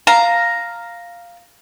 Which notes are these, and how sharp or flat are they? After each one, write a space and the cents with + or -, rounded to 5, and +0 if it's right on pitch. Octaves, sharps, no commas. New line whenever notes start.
F5 +0 A#5 +0